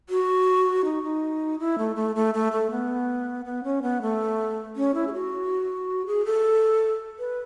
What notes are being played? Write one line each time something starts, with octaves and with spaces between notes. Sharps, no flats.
F#4
D#4
D#4
E4
A3
A3
A3
A3
A3
B3
B3
C#4
B3
A3
C#4
E4
G#4
F#4
G#4
A4
B4